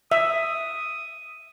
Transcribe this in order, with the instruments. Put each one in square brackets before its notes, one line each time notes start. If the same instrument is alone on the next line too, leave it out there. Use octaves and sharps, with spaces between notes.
[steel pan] E5 [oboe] D#6